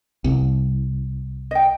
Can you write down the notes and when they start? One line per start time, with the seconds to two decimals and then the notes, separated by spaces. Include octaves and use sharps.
0.24 C2
1.51 D#5 G5